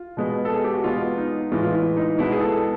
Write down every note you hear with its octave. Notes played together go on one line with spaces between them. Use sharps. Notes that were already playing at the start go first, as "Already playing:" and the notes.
Already playing: F4
B2 G#3 B3
A4
G#4
G4
F#4
B2 G#3 B3 F4
D#4
A2 E3 G#3 F4
F4
E4
D#4
B2 G#3 B3 E4
G#4
A4